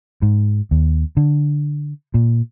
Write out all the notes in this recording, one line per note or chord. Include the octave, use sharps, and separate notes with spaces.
G#2
D#2
D3
A#2